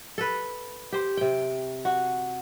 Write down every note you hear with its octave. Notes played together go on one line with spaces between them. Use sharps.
A4 B4
G4 C5
C3 G5
F#4